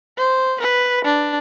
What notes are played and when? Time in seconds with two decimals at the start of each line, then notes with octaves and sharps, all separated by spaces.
0.18 C5
0.61 B4
1.05 D4